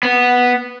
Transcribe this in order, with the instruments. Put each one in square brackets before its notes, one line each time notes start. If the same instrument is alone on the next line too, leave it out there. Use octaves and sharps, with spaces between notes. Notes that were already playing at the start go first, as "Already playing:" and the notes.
[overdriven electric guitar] B3